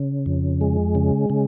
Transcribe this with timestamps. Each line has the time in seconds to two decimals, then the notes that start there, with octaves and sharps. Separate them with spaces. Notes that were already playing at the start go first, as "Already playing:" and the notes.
Already playing: C#3
0.26 F2
0.61 G#3
0.95 C#3
1.30 C#3